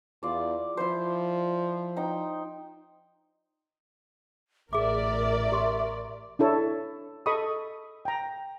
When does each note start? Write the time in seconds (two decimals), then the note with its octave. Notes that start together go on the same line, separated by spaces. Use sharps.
0.23 E2 F4 D5
0.77 F3 E4 C5
1.96 D#4 G5
4.73 A1 G#4 A#4 D5 E5 D6
5.52 G4 C6
6.39 D4 E4 A4 C#5
7.26 A4 D#5 B5 C#6 D#6
8.05 G5 A#5